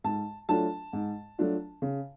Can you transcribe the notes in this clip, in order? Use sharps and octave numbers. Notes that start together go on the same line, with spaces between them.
G#2 A5
F#3 A3 D4 F4 A5
G#2
F#3 A3 D4 F4
C#3